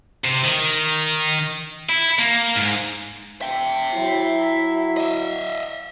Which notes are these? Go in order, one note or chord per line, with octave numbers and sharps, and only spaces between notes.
C3
D#3
E4
A#3
G#2
E5 G5
F#3 E4
D#5 E5